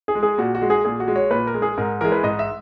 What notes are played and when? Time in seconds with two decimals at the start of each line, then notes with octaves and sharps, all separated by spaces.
0.08 G#4
0.15 G#3
0.23 G#4
0.38 A#2 F#4
0.55 F#4
0.62 G#3
0.70 G#4
0.85 A#2 G#4
1.00 F#4
1.08 G#3
1.16 C#5
1.31 A#2 B4
1.47 A#4
1.54 G#3
1.62 G#4
1.78 G#2 A#4
2.01 E3 G#3 A#4
2.12 B4
2.23 G#2 D#5
2.39 E5